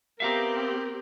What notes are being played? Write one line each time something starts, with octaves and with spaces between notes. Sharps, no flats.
B3 C4 G4 A#4 E5 F5 A#5